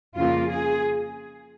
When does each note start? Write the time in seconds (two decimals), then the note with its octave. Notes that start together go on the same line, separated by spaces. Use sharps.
0.16 F2 C#3 A#3 F4
0.48 G#4